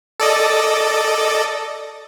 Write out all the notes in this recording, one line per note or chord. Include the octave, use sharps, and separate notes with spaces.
A4 D5 D#5